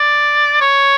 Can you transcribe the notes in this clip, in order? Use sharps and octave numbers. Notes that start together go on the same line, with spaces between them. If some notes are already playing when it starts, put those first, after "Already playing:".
Already playing: D5
C#5